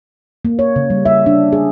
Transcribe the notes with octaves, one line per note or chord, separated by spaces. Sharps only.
A#3
C#5
C#3
G3
E5
D4
G#4